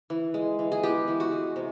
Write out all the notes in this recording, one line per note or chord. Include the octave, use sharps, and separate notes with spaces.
E3
G#3
E3
G#4
B3 G4
E3
F#4
G#3
C3